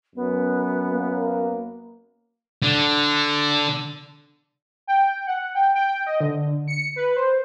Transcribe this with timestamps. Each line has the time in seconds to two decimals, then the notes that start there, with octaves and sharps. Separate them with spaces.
0.15 F#2 B3
0.89 A#3
2.63 D3
4.87 G5
5.27 F#5
5.55 G5
5.75 G5
6.07 D#5
6.21 D3
6.68 C#7
6.96 B4
7.16 C5